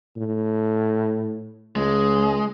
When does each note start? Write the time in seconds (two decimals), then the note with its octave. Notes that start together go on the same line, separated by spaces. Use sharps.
0.17 A2
1.76 C#2 G#3